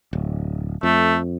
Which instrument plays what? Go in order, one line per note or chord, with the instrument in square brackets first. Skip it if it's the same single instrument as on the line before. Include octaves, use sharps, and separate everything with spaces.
[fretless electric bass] D1
[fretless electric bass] F2 [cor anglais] A3